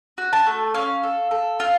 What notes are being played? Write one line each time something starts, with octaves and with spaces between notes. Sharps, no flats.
F#4
A5
A3
C#4 F5
A4
A4
F4